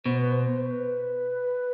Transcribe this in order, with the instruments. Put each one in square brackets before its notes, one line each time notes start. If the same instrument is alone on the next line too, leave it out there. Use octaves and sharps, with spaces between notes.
[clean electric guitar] B2 [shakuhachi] C5
[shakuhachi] B4
C5
B4